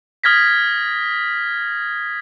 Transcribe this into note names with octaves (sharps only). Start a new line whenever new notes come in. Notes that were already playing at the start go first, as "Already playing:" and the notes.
D#6 F6 G#6 A#6 B6